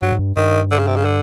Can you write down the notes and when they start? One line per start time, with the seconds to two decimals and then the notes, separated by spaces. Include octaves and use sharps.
0.02 G2 F#3
0.12 G#2
0.19 G2
0.37 G2 D#3
0.71 D3
0.79 C#3
0.87 C3
0.96 C#3
1.05 D3